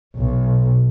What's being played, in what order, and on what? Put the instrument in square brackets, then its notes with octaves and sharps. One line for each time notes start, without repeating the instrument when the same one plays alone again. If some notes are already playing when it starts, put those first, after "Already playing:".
[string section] B1